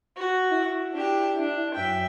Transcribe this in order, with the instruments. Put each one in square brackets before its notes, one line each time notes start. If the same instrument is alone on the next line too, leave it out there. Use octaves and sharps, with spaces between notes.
[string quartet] F#4
[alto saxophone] E4
[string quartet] D4 G4
D4
F#2 E5 G5